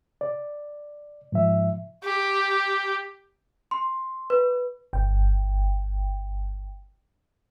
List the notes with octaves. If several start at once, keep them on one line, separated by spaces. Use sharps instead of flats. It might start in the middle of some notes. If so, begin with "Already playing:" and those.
D5
G#2 F3 E5
G4
C6
B4
G1 G5